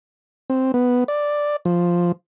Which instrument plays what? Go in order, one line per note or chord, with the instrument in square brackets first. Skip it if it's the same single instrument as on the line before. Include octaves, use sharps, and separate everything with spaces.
[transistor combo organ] C4
B3
D5
F3